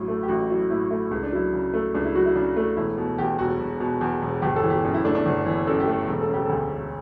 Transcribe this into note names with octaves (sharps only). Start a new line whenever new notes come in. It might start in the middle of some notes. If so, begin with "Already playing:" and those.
Already playing: A1 A2 F#3
A3
G4
A1 F#4
F#3 E4
A2 E4
A3 E4
C#2 E4
D4
F#3 E4
C#3
A3
C#2 D4
E4
F#3 F#4
E4
C#3 D4
A3
E1 E4
B2
E2 G4
E1 F#4
E1
B2
E2
E1
G1 G4
A4
E3
G4
F#2
E4
A3 D4
D4
G1
E3
F#2 A4
G4
A3
E1
A4
C#3
G4
D2 A4
E1